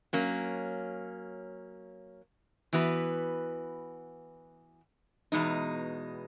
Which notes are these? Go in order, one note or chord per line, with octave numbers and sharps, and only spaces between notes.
F#3 A#3 C#4
E3 B3 F#4 B4
E2 B2 G#3 D#4